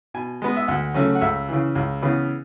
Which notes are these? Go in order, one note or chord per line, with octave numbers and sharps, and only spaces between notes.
B2 G#5
G#3 B3
E5
D2 F#5
C#3 F#3 A3 C#4
F#5
C#2 E5
C#3 E3
C#2
C#3 E3 B3